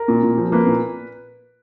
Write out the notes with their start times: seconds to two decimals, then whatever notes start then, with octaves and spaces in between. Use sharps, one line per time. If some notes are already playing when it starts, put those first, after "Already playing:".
Already playing: A#4
0.08 A#2
0.23 A#2
0.38 F3
0.52 A#3 B4
0.67 A#2